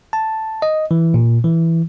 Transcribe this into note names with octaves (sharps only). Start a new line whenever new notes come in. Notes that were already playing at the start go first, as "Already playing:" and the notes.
A5
D#5
E3
A#2
E3